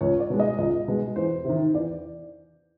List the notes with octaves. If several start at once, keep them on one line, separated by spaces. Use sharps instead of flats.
C#2 C#5
D5
B2 G#3
D#5
C#2 D#5
B2 G#3
E2 C5
C3 D#3
E2 D5